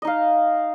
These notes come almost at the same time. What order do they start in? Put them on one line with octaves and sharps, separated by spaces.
D#5 D#4 F5